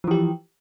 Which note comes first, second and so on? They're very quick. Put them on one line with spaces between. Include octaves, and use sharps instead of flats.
F3 E3 G4